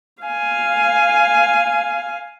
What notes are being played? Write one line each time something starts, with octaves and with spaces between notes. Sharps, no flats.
F5 G#5